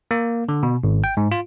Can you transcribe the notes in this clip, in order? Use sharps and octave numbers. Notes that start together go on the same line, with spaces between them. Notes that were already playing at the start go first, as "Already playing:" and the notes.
A#3
D3
B2
G#1
G5
G#2
F4